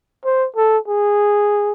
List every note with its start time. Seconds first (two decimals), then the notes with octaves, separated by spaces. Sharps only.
0.25 C5
0.57 A4
0.88 G#4